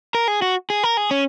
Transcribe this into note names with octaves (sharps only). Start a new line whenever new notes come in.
A#4
G#4
F#4
G#4
A#4
G#4
C#4